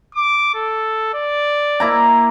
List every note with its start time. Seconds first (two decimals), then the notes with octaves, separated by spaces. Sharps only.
0.15 D6
0.54 A4
1.14 D5
1.80 A#3 E4 A#5